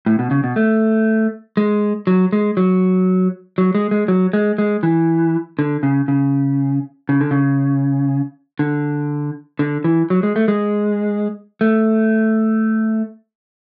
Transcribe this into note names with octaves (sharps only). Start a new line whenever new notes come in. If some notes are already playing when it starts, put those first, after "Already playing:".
A2
B2
C#3
B2
A3
G#3
F#3
G#3
F#3
F#3
G#3
G#3
F#3
G#3
G#3
E3
D3
C#3
C#3
C#3
D3
C#3
D3
D3
E3
F#3
G#3
A3
G#3
A3